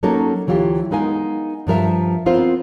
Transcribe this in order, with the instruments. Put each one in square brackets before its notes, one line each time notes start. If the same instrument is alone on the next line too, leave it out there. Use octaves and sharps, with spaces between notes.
[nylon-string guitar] F#3 A#3 C#4 D#4 A4 A#4
D2 E3 F#3 F4 G4
G#3 B3 D#4 A#4 F5 G#5
G2 F3 A#4 E5
B3 C4 F4 A#4 C5